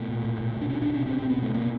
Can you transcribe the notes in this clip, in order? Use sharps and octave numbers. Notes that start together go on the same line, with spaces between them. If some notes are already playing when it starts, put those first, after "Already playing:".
Already playing: B2 A3
A#2
A#2
A#2
B2 D4
B2 C#4
D4
B2 C#4
B2 C4
B2 C4
B3
B2 A3
B2 A#3